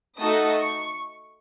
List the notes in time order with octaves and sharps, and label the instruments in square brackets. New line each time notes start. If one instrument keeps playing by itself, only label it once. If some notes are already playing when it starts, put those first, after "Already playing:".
[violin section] A3 D#4 F#4 A4 D#6
C#6